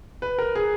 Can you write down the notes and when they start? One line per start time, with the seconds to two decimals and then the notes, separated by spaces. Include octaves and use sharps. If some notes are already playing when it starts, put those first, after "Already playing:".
0.22 B4
0.39 A#4
0.55 G#4